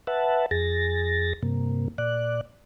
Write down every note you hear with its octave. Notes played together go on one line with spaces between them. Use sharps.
B4 E5 F#5 A5
F2 G#4 A6 A#6
G2 C3 A#3
A#2 D5 F#6